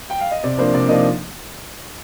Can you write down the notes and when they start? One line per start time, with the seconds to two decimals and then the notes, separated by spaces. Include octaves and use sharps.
0.10 G5
0.20 F5
0.31 D#5
0.44 C3 D5
0.58 F3 A#3 D4 C5
0.73 C3 D5
0.89 F3 A#3 D4 D#4 D#5